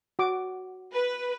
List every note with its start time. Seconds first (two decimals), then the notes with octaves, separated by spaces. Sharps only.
0.19 F#4 D6
0.93 B4